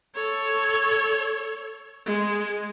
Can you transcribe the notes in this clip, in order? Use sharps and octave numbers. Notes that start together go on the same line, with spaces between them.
A4 C#5
G#3